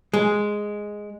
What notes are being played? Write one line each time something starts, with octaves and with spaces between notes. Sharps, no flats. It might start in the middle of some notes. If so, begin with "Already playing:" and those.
G#3